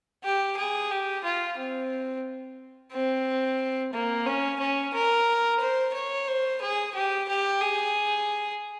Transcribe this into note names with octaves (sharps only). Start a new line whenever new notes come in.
G4
G#4
G4
F4
C4
C4
A#3
C#4
C#4
A#4
C5
C#5
C5
G#4
G4
G4
G#4